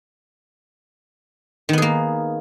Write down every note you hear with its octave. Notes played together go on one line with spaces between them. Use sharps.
D#3 A#3 B3 G#4